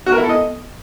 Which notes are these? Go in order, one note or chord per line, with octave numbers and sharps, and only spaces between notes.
F#4
A#4
E4
A4
D#5